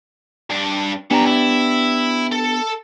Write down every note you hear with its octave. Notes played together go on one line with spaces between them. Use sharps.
G2 D4
B3 C#4 D4 G4 A#5
E4
A4